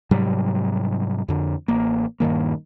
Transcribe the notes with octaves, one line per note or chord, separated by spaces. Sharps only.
G#2 C3 F#3 G3
F2 D3
A1 A#3
D#1 G2 D#3 A#3